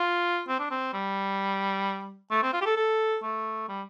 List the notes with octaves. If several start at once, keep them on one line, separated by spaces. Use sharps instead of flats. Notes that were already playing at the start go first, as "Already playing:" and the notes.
Already playing: F4
C4
D4
C4
G3
A3
C4
F4
G4
A4
A4
A3
G3